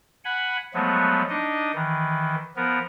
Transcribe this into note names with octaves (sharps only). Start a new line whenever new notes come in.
F#5 G#5 B5
F3 F#3 G#3 A3 B3
D4 D#4 D#5
D#3 E3
F3 B3 A#4